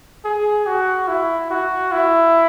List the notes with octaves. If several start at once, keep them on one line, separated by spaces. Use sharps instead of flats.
G#4
F#4
E4
F#4
E4